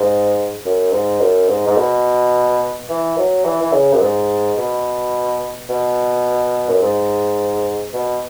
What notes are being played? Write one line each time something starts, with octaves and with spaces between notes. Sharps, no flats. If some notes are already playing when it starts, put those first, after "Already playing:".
Already playing: G#2
F#2
G#2
F#2
G#2
G#2
B2
E3
F#3
E3
E3
C#3
F#2
G#2
B2
B2
F#2
G#2
B2